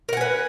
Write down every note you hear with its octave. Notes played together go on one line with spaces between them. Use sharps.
A#4 B4 F#5 G#5